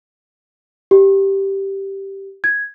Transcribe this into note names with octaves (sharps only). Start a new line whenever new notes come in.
G4
G#6